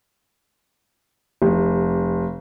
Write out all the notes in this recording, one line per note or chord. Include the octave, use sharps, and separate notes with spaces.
F1